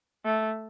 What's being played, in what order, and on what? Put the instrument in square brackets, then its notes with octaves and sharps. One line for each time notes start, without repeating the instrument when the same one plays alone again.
[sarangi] A3